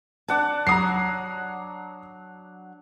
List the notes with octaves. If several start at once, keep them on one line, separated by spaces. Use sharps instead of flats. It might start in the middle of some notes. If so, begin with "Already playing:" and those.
D4 D5 F#5 A5
F#3 A#5 D#6 C7